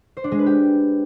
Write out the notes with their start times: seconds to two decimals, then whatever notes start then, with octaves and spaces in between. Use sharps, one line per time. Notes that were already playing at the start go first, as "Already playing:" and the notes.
0.17 C5
0.24 D4
0.31 G#3
0.39 B4
0.46 G4